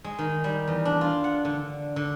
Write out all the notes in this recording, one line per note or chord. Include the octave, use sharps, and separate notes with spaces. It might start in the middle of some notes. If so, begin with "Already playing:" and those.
G#3
D#3
G3
E2
D4
F4
F#5
D3
D3